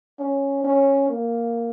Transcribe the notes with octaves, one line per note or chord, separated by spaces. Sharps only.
C#4
C#4
A#3